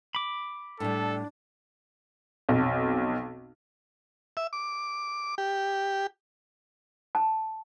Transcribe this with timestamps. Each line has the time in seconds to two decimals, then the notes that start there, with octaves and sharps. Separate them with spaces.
0.15 B5 D6
0.80 A2 G3 D4 A4
2.49 B1 F2
4.37 E5
4.53 D6
5.38 G4
7.15 A5